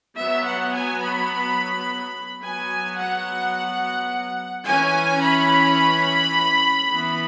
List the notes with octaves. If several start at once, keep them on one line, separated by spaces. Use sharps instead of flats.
F#3 B3 E5
F#5
G#5
B5
F#3 B3 G#5
F#5
E3 C#4 G#5
B5
E3 B3